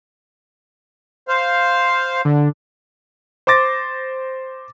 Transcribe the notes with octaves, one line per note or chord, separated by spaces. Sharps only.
C5 F5
D3
C5 C6 D6 A6 A#6